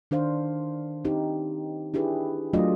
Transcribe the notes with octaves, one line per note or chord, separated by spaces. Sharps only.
D#3 D4 C5 F5
C4 D#4 G4
D4 E4 G4 G#4 B4
F#3 A3 D4 F4 D5 D#5